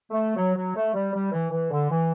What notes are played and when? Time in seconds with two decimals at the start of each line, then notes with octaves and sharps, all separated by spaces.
0.11 A3
0.36 F#3
0.55 F#3
0.75 A3
0.94 G3
1.13 G3
1.31 E3
1.50 E3
1.70 D3
1.90 E3